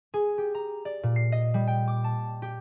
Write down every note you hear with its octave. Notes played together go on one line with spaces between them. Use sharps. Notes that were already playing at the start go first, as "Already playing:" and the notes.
G#4
G4
A#5
D5
A#2
C7
D#5
G3
G5
D6
A5
G4